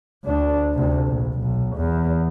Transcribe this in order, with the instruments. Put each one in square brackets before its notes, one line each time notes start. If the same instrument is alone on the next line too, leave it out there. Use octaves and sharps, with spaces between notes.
[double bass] D2 D4
D2 C3
A#1
B1
E2